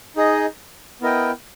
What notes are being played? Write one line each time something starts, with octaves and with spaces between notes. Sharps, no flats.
D#4 G#4 D#5
B3 E4 A#4 D#5 G5